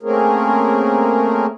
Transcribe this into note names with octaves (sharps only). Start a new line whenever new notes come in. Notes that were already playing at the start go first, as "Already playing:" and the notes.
A3 A#3 C4 C#4 G#4 A#4